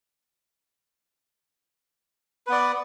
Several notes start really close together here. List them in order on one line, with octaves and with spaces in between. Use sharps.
B4 B3 D5